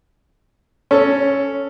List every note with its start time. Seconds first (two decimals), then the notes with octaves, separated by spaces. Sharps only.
0.91 C#4 A4